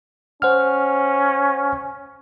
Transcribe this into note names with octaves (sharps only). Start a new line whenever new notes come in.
C#4 C5 F#5 F6